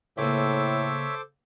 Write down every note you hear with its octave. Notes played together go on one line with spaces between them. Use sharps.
C#2 A2 A#3 A4 C5 C#5 E5 D6